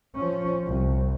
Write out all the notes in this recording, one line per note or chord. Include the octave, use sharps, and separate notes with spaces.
F3 C#4
C2